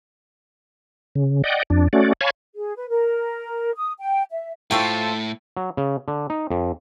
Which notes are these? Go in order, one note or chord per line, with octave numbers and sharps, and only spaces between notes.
C#3
D5 D#5 F#5 G5
F2 D4
A3 C#4 F#4 D5
C#5 F5 G#5 A5 B5 C#6
G#4
B4
A#4
D#6
G5
E5
A2 E4 F4 A4 C5 G5 C#6
F#3
C#3
D3
D#4
F2